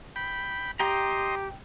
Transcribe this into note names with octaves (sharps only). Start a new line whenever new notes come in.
G5 B5
G4 D#5 G5 A#5 C6